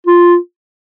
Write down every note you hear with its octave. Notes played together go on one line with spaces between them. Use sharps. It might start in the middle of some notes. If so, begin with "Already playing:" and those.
F4